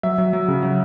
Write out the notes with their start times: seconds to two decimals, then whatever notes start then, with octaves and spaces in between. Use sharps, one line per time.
0.03 F#3 E5
0.18 F#3
0.33 F#3
0.48 C#3
0.63 F#3